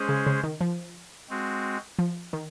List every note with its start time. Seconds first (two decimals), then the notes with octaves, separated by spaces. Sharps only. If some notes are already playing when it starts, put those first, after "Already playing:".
Already playing: G#3 C#4 G#4 C5
0.09 C#3
0.26 C#3
0.43 D#3
0.61 F3
1.30 G#3 C4 F#4
1.99 F3
2.33 D#3